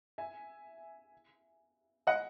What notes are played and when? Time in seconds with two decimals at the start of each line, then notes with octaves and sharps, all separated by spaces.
0.18 E5 G#5
2.07 D#5 F#5